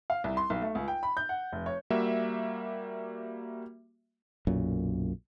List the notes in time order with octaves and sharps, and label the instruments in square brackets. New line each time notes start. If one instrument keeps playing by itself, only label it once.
[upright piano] F5
C2
C6
B1
A3
C#2
G5
B5
G6
F#5
F1
C#5
[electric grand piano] G3 A#3 F#4 E5
[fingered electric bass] B1 F#2 A#2